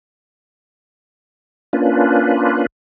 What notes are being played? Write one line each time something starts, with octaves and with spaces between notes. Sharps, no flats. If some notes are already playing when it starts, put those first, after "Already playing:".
A#3 C#4 D4 F4 B4